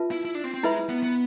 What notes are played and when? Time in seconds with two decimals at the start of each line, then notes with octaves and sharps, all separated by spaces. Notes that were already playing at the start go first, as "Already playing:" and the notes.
Already playing: F4 B4 E5 A5
0.11 E4
0.25 E4
0.35 D4
0.44 C4
0.54 C4
0.63 G#3 E4 B4 E5 B5
0.89 B3
1.03 B3